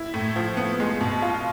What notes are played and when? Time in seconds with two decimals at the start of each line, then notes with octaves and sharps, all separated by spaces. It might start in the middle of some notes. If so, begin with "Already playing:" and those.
Already playing: E4
0.14 A2
0.36 F3
0.57 B3
0.80 G#3
1.01 B2
1.22 F4